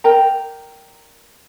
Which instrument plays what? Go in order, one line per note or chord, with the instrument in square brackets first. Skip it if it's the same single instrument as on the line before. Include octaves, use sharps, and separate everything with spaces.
[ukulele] A#4 D5 G5 A#5